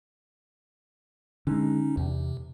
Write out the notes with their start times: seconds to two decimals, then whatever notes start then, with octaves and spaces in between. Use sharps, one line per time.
1.47 D3 G#3 C#4 D#4
1.97 E2 C3